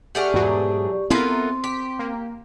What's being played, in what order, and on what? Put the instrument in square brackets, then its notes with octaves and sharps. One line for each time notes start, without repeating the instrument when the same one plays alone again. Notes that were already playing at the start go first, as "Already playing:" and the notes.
[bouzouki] A3 D4 G#4 [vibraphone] G4 D5 C#6 [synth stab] F#5 F6
[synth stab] E2 B2 F#3 [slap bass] G#2
[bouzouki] B3 F4 A4 [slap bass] C4 [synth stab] E4 A#4 [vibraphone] C6
[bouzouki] G4 [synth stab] B6
[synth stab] A#3